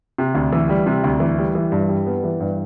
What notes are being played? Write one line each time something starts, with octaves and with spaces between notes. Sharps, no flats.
C3
D2
E3
G3
C3
D2
E3
G3
E3
G2
G3
B3
E3
G2